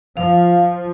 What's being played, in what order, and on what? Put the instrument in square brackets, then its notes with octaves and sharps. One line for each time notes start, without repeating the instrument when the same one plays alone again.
[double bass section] F3 [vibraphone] F5